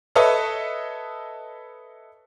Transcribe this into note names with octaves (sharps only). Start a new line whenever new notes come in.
A4 B4 C#5 D#5 E5